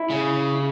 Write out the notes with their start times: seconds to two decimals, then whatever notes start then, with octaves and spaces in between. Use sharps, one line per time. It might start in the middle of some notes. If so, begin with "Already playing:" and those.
Already playing: E4
0.10 C#3